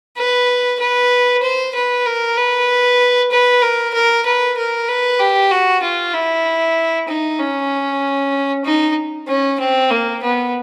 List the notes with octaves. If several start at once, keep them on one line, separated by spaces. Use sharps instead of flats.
B4
B4
C5
B4
A#4
B4
B4
A#4
A#4
B4
A#4
B4
G4
F#4
F4
E4
D#4
C#4
D#4
C#4
C4
A#3
B3